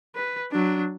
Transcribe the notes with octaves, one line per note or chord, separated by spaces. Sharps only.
B4
F#3 D4